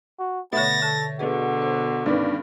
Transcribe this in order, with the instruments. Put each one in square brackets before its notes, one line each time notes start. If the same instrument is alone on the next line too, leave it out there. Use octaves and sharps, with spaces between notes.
[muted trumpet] F#4
[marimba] B2 D3 [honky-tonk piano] A3 C#5 [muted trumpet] B3 [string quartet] A6 A#6
[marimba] D3 [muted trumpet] A4
[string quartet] B2 D3 [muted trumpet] F#4 [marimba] G#4 B4 D#5
[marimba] C5
[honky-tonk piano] G2 D#3 B3 [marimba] C#4 [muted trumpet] D5